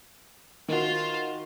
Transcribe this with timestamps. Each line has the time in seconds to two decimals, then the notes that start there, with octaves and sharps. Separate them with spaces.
0.68 D#3 F4 F#4 C5